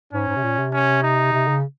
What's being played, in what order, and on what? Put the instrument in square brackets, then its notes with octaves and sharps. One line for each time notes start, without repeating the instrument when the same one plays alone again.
[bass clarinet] G#2 [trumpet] C#4
[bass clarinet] G#2
C3
A#2
C3
[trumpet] C#4
D#4
[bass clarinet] C3
C#3